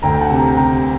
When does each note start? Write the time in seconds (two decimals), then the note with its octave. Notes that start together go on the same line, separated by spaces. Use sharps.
0.02 D2 G5 A#5
0.20 F#5 A5
0.30 C3
0.39 G5 A#5
0.56 C3 G5 A#5